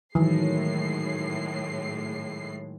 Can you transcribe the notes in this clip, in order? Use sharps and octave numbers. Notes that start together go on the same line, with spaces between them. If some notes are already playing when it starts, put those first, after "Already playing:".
A2 D#3 E3 F#3 G#3 C7